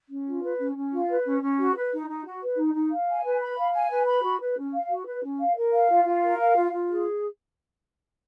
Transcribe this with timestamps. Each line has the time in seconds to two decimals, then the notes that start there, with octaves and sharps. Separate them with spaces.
0.08 C#4
0.25 F4
0.42 B4
0.58 C#4
0.75 C#4
0.92 F4
1.08 B4
1.25 C#4
1.41 C#4
1.58 F#4
1.74 B4
1.91 D#4
2.07 D#4
2.24 F#4
2.40 B4
2.57 D#4
2.74 D#4
2.90 F5
3.07 G#5
3.23 B4
3.40 B5
3.57 F5
3.73 G#5
3.90 B4
4.07 B5
4.22 F#4
4.40 B4
4.56 C#4
4.73 F5
4.89 F#4
5.06 B4
5.22 C#4
5.38 F5
5.56 A#4
5.72 F5
5.89 F4
6.06 F4
6.21 A#4
6.38 F5
6.55 F4
6.71 F4
6.88 G#4